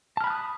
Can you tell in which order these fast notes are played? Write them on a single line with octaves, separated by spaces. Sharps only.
A5 F6 B5 F#6 D#6